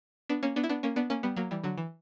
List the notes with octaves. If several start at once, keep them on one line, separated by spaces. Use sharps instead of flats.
B3 D4
A#3 C#4
B3 D4
E4
B3 D4
A#3 C#4
B3 D4
A#3 C#4
G3 B3
F#3 A#3
E3 G3
D3 F#3
E3